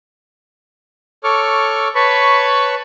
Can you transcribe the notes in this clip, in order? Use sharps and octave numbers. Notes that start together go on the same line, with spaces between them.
A4 C#5 C#6 D6 F6
B4 C#5 A5 B5 C#6